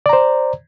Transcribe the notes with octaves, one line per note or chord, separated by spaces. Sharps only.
C5 D5 A#5